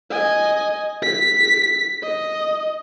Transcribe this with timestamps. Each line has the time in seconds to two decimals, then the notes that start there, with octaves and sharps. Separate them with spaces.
0.10 D#5 G#5
1.02 B6
2.03 D#5